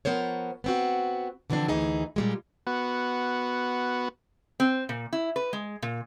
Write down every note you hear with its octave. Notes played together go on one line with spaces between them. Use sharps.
F3 B3 A#4 C5 C#5
B3 C4 F#4
D3 E3 F3 C4 D4
D2 E3 D#4 G#4
A#2 G3 G#3
B3 F#4
C4
A#2
E4
B4
G#3
A#2